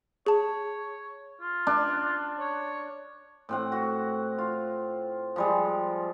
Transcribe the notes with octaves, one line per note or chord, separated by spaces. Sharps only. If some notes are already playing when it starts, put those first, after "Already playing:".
G#4 C#5 A5
F4
D4
C#5
A2 C4 F#5
F#4
F4
F3 G3 G#3